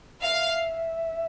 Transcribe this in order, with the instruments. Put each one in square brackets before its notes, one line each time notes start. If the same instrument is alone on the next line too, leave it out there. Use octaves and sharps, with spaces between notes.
[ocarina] E5 [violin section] F5